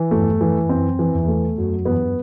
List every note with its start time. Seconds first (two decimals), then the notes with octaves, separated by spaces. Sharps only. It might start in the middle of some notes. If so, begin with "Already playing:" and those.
Already playing: E3
0.11 E2 G2 A3
0.40 F#2 E3
0.69 F#2 C4
0.99 E3
1.14 E2
1.28 A3
1.56 F#2 F#3
1.85 E2 G2 B3